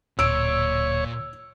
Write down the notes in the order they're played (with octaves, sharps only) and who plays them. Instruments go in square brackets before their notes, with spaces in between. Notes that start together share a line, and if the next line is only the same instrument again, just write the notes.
[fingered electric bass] D1 [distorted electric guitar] A#2 [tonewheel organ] C#5 [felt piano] E6 D7